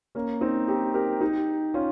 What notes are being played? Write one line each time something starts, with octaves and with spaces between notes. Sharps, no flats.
A#3 C#4
C4 D#4
D#4 G4
G4 A#4
D#4 G4
C#4 F4